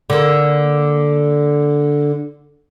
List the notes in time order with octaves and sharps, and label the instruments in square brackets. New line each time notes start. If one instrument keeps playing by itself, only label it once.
[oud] D3 A#3